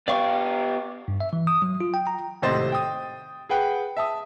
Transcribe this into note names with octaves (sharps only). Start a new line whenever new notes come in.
B3 G4 D5 F5 C#6
G2
E5
E3
D#6
F#3
F4
G5
A#5
G#1 A2 C3 C5 D#5 A6
G5 D#6
G#4 B4 F#5 G5
E5 A5 D#6